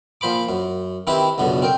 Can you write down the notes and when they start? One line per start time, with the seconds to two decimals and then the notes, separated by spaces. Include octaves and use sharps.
0.21 A#2 F3 C5 B5 D6
0.49 F#2
1.07 D#3 C4 E4 G4 B4
1.38 C#2 F#2 B2 D3
1.62 C4 A#4 G5